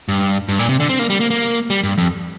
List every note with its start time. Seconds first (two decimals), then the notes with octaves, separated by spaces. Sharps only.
0.08 G2
0.49 G2
0.59 A#2
0.69 C3
0.80 D3
0.89 C4
0.99 A#3
1.10 G3
1.20 A#3
1.30 A#3
1.70 G3
1.84 G2
1.98 F2